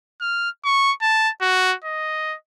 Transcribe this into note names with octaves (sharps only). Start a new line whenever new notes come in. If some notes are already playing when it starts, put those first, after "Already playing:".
F6
C#6
A5
F#4
D#5